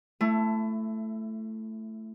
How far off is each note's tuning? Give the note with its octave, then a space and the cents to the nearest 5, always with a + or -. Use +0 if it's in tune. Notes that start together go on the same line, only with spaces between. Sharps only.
A3 +0 E4 +25